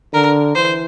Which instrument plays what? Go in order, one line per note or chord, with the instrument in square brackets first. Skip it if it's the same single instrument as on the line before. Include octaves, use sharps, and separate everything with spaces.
[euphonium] D3 [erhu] A#4
[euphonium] E3 [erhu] C5